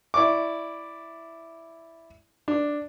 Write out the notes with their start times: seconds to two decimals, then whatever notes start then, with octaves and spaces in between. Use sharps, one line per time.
0.14 E4 D5 C#6 D6
2.48 D4